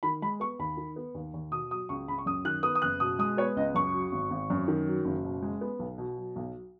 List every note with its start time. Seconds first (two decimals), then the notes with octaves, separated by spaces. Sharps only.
0.03 D#3 B5
0.22 G#3 B5
0.40 B3 C#6
0.59 D#2 B5
0.77 D#3
0.96 B3
1.15 D#2
1.34 D#2
1.51 B2 D#6
1.71 F#3 D#6
1.89 C#2 C#6
2.08 C#2 B5
2.18 C#6
2.26 F#2 D#6
2.45 D#3 F#6
2.63 B3 D#6
2.75 D#6
2.82 F#1 F#6
3.00 B2 D#6
3.19 G#3 D#6
3.37 B3 C#5
3.56 C#2 D#5
3.75 F#2 C#6
3.94 F#3
4.12 G#1
4.30 G#1
4.50 F#2
4.68 D#3
4.87 F#3
5.05 F#1
5.24 B2
5.42 G#3
5.61 B3
5.79 B1
5.98 B2
6.17 F#3
6.36 B1